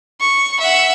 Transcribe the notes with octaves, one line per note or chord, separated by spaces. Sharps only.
C#6
E5 F#5